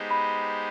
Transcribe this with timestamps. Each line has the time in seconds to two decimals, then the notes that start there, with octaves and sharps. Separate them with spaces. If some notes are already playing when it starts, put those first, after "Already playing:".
Already playing: G#3 B3 D#4 G4 C5
0.11 B5